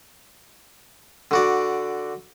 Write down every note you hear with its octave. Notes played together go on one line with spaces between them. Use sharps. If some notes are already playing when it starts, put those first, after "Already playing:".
D3 F#4 D5